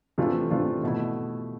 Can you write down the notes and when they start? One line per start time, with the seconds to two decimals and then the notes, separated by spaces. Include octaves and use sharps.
0.18 C3 E3 A3 D4 F4
0.50 C3 E3 A3 D4 F4
0.83 B2 A3 E4